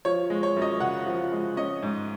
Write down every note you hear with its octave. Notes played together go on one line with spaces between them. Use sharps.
F3 C#5
G#3
C#5
F#2
D#5
C#3 F#5
F3
G#3
C#4 D#5
G#2